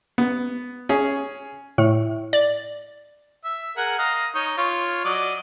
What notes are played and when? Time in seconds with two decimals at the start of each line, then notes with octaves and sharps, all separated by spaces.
0.18 B3
0.89 C#4 G#4
1.78 A2
2.33 D5
3.45 E5
3.77 G#4 A#4 F#5
3.99 D#5 F5 A#5
4.35 D#4 C#5
4.57 F4 C#5
5.05 F#3 D5 D#5